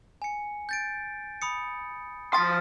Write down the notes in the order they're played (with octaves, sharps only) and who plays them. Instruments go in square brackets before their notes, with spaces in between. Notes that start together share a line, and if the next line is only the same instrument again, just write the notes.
[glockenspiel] G#5 C#7
G6 A6 D7
B5 D#6 C#7
[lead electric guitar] F3 C6 [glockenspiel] D#6 A6 B6